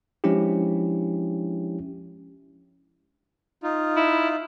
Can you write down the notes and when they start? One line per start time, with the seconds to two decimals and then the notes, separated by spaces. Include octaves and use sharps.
0.24 F3 G#3 C#4 D4 E4 G4
3.63 D#4 F4
3.96 E4